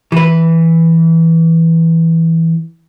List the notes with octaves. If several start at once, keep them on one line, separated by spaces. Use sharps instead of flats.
E3 B4